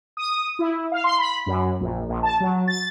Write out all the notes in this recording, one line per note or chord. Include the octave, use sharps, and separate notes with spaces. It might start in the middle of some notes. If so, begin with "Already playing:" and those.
D#6
E4
F5
C6
B5
F#2
A#1
A#1
A5
F#3
A6